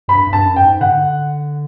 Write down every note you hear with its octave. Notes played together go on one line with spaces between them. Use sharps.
G2 B5
G2
A5
F#2
G5
G#2
D3 F#5